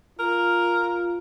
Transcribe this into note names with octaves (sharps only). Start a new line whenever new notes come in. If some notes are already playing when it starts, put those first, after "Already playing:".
F4 A#4